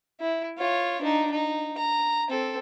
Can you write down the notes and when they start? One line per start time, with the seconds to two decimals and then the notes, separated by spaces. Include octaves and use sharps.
0.20 E4
0.58 F4 C#5
1.02 D4 D#4
1.31 D#4
1.78 A#5
2.29 C4 A4